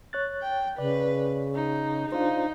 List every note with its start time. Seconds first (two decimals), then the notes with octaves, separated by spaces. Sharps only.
0.13 C#5 F#6 A6
0.43 G5
0.78 C#3 B4 D5
1.55 D#4
2.12 D4 D#4 F4 C5 F5